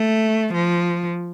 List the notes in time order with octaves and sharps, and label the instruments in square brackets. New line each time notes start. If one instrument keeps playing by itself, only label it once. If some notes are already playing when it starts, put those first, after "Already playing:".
Already playing: [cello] A3
F3